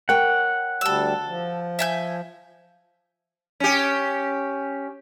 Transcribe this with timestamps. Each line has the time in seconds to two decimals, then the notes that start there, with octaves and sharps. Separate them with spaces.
0.09 A#4 C#5 F#5 G5
0.81 D2 G3 A4 E6
1.27 F3
1.79 E5 G#5 G6
3.60 C#4 G4